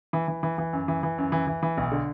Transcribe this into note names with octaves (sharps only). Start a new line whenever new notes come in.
E3
E3
E3
E3
F#2
E3
E3
F#2
E3
E3
E3
B1
D3